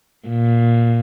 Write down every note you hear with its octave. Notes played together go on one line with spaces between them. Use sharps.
A#2